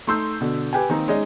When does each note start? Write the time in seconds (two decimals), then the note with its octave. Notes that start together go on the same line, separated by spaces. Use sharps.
0.07 A3 D#4 C6 E6 G6
0.41 B2 D3
0.73 G4 B4 G5 G#5
0.89 D#3 A#3 C4 D#4
1.08 G#3 C#4 D#4 D5 D#5